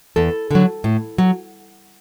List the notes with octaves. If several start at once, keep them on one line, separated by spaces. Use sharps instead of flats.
E2 A4
D3 F#3
A2
F#3